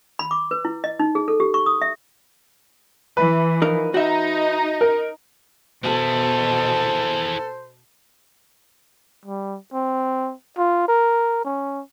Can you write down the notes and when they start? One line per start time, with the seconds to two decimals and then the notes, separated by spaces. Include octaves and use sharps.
0.19 B5
0.31 D6
0.51 B4
0.65 E4
0.84 D#5
0.99 D#4
1.15 G#4
1.28 A4
1.40 G4
1.54 C#6
1.66 D#6
1.82 E5
3.17 E3 B4
3.62 F3 D#4 A#4
3.94 D#4 F#4 E5
4.81 A#4
5.84 B2 E4 G#4 A4 C5
9.26 G3
9.73 C4
10.58 F4
10.88 A#4
11.45 C#4